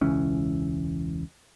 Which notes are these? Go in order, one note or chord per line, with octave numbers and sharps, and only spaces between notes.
E1 C#2 E3 C#4